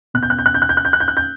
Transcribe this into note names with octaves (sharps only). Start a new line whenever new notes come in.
B2 F#6
G6
F#6
G6
F#6
G6
F#6
G6
F#6
G6
F#6
G6
F#6
G6